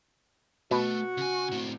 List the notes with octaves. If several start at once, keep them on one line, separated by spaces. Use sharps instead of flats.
B2 A3 F#4
C#3 G#5
A2 C4